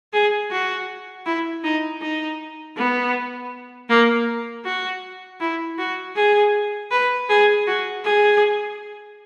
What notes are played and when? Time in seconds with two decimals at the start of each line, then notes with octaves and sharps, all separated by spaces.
0.13 G#4
0.51 F#4
1.25 E4
1.63 D#4
2.02 D#4
2.77 B3
3.89 A#3
4.65 F#4
5.40 E4
5.79 F#4
6.16 G#4
6.91 B4
7.29 G#4
7.67 F#4
8.05 G#4